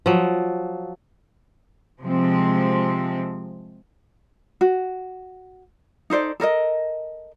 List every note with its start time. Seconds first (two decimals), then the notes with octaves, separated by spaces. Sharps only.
0.06 F3 F#3
2.01 C3 F3 G#3 C4
4.61 F#4
6.10 D#4 A4 C5 D5
6.40 A4 A#4 D5 D#5